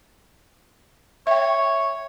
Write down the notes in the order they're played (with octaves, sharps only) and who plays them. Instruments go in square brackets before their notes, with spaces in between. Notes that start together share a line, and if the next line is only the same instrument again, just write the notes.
[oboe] C#5 [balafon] E5 G5